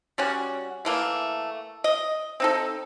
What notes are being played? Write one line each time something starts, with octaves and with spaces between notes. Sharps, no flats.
G3 C#4 F#4
E3 A3 A#3
D#5
C4 D#4 A4